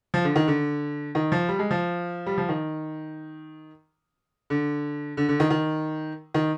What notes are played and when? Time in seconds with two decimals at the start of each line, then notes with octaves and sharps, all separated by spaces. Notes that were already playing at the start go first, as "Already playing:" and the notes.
0.14 F3
0.24 D3
0.36 D#3
0.48 D3
1.15 D#3
1.32 F3
1.49 G3
1.59 G#3
1.71 F3
2.26 G3
2.38 F3
2.49 D#3
4.50 D3
5.17 D3
5.29 D3
5.40 D#3
5.50 D#3
6.34 D#3